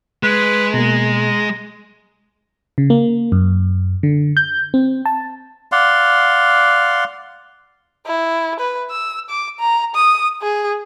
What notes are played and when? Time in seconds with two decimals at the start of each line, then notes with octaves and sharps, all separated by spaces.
0.23 G#3 B4
0.74 B2 A#3 A#5
2.78 C#3
2.90 A#3
3.32 F#2
4.03 D3
4.37 G6
4.74 C4
5.05 A5
5.72 D5 F5 F#5 C6
8.07 E4
8.60 B4
8.91 E6
9.30 D6
9.59 A#5
9.95 D#6
10.42 G#4